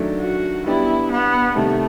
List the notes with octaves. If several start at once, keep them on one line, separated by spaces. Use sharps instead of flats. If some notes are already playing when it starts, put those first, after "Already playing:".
Already playing: D#3 F#3 A3 D4
F#4
G3 B3 D4 E4 G4
B3
C3 D#3 G3 A3